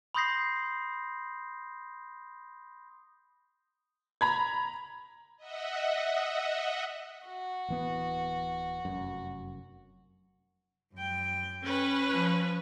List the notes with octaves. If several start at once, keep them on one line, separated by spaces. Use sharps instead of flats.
B5 C6 D#6 G6 A#6 C7
A#5 B5 G#6
D#5 E5 F#5
F#4
D1 E3 B3
F1 F#2
F#2 G5
C#4 B4
F3